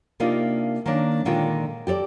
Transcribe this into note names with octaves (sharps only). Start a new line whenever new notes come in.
C3 A#3 D4 D#4 F4
D#3 A#3 C#4 D4
A#2 D3 D#3 G#3 F4 G5
G4 A4 C#5 D5